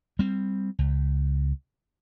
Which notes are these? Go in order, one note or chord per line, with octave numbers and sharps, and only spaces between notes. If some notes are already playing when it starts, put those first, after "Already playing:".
G3 C4
C#2